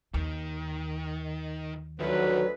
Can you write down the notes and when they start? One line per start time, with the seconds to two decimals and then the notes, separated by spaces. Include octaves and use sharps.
0.14 D#2 D#3
2.00 D2 D#3 F3 F#3 B4